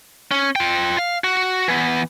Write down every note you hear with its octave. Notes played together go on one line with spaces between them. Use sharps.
C#4
F4 G5
F5
F#4
E3 B3